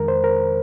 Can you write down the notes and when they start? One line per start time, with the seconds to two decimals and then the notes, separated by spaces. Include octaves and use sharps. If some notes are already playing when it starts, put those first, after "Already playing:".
Already playing: F2 D#3 G#3 A#4
0.08 C5
0.24 A#4